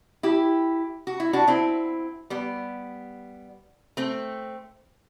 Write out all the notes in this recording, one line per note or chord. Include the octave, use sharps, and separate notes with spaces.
E4 G4
F#4
E4
D4 F#4
C4 E4
G3 B3
A3 C4